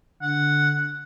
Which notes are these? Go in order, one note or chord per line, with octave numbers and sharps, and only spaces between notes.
D3 F#5